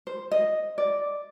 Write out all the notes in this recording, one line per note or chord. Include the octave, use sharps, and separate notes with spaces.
C5
D#5
D5